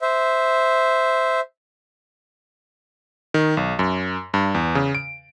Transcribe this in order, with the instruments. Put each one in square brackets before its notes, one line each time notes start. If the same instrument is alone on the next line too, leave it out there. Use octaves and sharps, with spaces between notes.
[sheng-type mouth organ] C5 E5
[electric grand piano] D#3
B1
F#2
G2
E2
C#3
D7